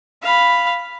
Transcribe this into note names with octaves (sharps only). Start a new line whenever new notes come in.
F5 B5